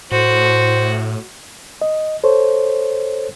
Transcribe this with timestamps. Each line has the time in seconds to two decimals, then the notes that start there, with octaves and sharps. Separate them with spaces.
0.12 A2 F#4 C5
1.82 D#5
2.24 A4 C5 C#5